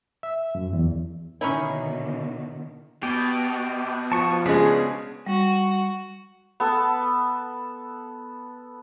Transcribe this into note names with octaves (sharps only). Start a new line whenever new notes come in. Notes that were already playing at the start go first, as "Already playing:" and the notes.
E5
F#2
E2
B2 D3 D#3 C#4 D#4 E4
B2 G4
F3 A5 C#6 D#6
C#3 G#3 D4 C#5
G3 F#4
B3 A4